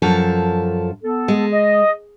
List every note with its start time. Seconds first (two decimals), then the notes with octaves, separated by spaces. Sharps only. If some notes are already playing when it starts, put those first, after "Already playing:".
0.02 F#2 F3 A4
1.03 B3 A4
1.28 G#3
1.52 D#5